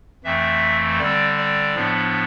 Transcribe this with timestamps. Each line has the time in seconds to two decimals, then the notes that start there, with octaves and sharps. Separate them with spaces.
0.24 F2 E3 A3 C4 E5
0.99 D3 G3 C4 D5
1.37 D5
1.75 A2 F3 B3 D4